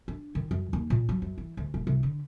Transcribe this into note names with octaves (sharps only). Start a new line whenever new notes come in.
D4
D#3
F#2
D#2
A#2
F#3
F#2
E3
D2
D#1
C2
D3